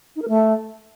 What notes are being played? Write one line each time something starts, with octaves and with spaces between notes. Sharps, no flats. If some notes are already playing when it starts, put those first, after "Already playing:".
D#4
A#4
A3